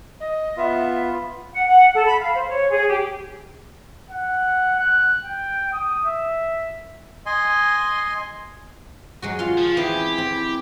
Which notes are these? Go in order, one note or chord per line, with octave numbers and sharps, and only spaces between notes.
D#5
B3 F4 E5
F#5
F#5
A4
B5
F5
C5
C#5
G#4
G4
F#5
F#6
G5
D#6
E5
D#5 G#5 C6
F#3 G#3 F#4
F4 C#5 F5 C6
F3
E3 C4 E4 G4 G#4
C4